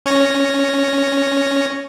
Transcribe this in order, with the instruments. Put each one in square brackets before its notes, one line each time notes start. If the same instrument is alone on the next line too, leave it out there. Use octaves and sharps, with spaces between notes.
[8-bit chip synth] C#4 C#5 A#6